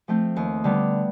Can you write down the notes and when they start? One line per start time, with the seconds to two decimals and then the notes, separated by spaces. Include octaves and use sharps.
0.08 F3 A3 C4
0.36 D#2
0.64 D3 G3 B3